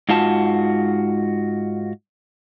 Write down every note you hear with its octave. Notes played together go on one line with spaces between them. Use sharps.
G#2 F4 F#4 A5